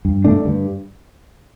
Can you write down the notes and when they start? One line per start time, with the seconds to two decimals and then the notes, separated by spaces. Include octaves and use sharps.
0.05 G2
0.25 D3 A3 D4
0.45 G2